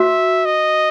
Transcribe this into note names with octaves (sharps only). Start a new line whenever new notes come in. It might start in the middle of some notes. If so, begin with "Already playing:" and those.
Already playing: F#4 E5
D#5